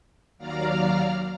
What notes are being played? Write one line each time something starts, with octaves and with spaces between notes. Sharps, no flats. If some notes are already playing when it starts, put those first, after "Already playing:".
D#2 F#3 D5 F5 A#5 F6